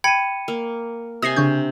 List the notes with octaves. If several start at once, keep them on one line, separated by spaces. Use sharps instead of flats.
G5 B5 G#6 C#7 D#7
A#3
C3 G#5 D#6 A#6 C7
C#3 D4 C#6 G6